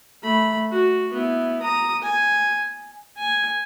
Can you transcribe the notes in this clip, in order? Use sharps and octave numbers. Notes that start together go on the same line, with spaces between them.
A3 B5
F#4
B3 E4
A#5 D#6
G#5
G#5